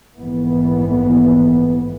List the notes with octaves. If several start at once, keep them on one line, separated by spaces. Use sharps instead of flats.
A#1 F2 G#2 E3 B3